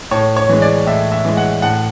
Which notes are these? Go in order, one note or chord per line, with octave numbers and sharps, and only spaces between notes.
A2 C#5
C#5
E3 G#3
D5
A2 E5
E5
E3 G#3
F#5
A2 F#5